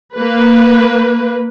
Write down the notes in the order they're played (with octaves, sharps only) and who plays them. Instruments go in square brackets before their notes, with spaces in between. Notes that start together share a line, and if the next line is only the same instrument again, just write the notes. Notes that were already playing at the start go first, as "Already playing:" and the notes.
[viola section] A#3 B4